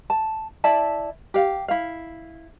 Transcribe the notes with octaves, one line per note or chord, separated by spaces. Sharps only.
A5
E4 D5 E5 A5
G4 F5
E4 F5